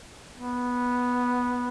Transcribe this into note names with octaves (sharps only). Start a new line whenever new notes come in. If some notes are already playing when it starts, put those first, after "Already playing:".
B3